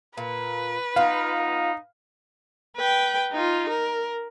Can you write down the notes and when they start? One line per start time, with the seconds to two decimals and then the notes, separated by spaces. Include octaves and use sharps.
0.17 A#2 B4
0.96 B3 D#4 F4 F5
2.77 B4 G5
3.32 D#4 F4
3.69 A#4